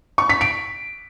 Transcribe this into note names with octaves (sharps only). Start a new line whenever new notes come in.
C#6
B6
D7